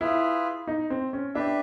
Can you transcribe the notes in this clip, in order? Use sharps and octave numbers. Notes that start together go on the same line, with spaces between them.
E4 F4 G#4 B4
D#4
C4
C#4
D4 G4 B4 E5